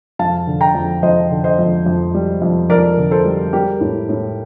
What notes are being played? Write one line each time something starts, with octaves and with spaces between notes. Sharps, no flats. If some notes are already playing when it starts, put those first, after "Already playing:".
F2 F5 A5
D3
G5 A#5
F2
F2 C5 D#5
D3
C5 D#5
F2
F2
G3
F2
F2 A#4 D5
D3
A4 C5
G3
G3 G4 A#4
A2
A2